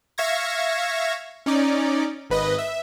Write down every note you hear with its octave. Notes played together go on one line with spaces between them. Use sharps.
E5 F5 C#6 G#6 A#6
C#4 D#4 D5
G#1 B4 D#5
E5